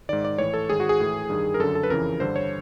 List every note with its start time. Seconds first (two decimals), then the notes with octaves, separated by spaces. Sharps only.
0.09 G#2 D#3 D5
0.25 D5
0.38 A2 E3 C#5
0.54 A4
0.70 G#2 D#3 G#4
0.80 F#4
0.89 G#4
1.00 A2 E3
1.30 G2 D#3
1.54 A#4
1.59 F#2 D3 A4
1.75 A4
1.83 B4
1.90 F2 C#3 E3 A#4
2.20 G2 D3 C5
2.36 C#5